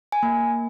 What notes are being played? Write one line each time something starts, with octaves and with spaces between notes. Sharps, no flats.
G#5
A#3